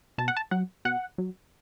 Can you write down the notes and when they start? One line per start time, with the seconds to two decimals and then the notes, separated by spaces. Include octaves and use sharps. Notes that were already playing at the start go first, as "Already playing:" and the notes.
0.18 B2 A5
0.28 F#5
0.37 A5
0.51 F#3 F#5
0.85 B2 F#5
1.18 F#3